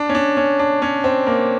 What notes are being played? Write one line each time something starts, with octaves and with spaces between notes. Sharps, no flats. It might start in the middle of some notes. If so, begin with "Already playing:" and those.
Already playing: D4
C#4
D4
C#4
D4
C#4
C4
A#3